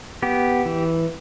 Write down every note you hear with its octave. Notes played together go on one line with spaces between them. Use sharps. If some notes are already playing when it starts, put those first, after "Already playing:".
B3 G4
E3